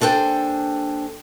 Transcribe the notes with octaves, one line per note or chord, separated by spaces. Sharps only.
D#2 D4 A4 C5 G5 G#5